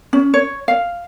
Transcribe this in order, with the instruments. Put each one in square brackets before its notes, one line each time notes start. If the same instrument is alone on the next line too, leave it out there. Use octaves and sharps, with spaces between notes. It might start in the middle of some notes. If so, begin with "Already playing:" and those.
[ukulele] C#4
C#5
F5